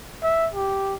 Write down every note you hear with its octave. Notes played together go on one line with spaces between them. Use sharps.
E5
G4